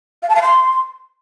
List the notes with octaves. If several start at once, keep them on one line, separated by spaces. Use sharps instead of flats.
F5
A5
F5
C6